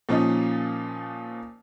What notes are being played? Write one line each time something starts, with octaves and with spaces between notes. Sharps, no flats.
A#2 F3 C#4 D#4